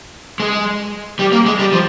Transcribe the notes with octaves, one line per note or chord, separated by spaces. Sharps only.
G#3
G3
A#3
G#3
G3
F3